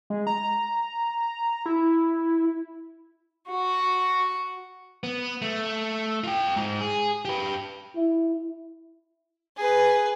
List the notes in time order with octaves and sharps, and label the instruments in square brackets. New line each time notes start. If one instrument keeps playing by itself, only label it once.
[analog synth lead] G#3
A#5
E4
[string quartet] F#4
[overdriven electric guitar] B3
A3
F4 G5
G#2
G#4
G4 B4
[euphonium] E4
[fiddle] G#4 B4